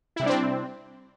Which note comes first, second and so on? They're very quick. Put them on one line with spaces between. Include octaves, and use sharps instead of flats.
E4 C3 G3 D4 C4